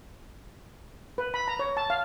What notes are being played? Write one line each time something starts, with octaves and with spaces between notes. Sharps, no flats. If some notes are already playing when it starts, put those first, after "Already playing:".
B4
B5
A#5
C#5
A5
F5